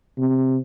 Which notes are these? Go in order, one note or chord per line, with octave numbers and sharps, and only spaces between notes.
C3